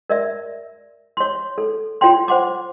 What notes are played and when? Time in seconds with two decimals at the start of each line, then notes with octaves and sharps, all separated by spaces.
0.10 A#4 D5 E5
1.17 C#5 C6
1.58 A4
2.01 F4 C#5 G5 C6
2.28 C5 F#5 C6 D6